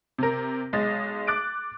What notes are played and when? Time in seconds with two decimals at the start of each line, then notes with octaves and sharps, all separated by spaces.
0.18 C3 A#4
0.73 B1 G#3 D#5 A6
1.27 D6 F#6 A6 D7